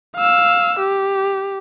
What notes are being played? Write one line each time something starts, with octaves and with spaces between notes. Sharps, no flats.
F5 E6
G4